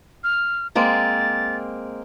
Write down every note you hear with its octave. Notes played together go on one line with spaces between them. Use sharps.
F6
G#3 A#3 C4 A6